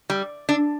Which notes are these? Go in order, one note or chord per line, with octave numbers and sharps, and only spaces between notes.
G3
D4